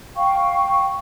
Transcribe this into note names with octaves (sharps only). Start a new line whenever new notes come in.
F5 G5 C#6